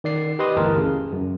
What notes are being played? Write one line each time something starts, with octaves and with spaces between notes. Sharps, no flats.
D#3 D5 C7
G4 B4 D#5 C6 D#6
G1 D2 E3 A#4 A5
C#3
F#2